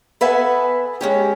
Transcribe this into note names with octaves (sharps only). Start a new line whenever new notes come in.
B3 A4 B4 E5 F#5 G#5
G#3 C#4 G4